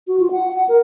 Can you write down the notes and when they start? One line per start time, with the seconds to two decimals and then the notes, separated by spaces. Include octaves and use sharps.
0.07 F#4
0.20 F4
0.31 F#5
0.51 F#5
0.69 A#4